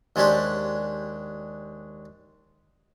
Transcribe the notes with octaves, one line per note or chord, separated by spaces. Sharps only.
D#2 G#3 C#4 D4 G4 C5